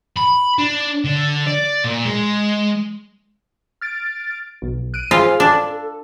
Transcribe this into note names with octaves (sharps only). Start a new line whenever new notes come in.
B5
D4
D3
D5
A#2
G#3
F6 A6 D7
B1
F#6 D7 D#7
F4 G#4 C5 G#5
D4 A4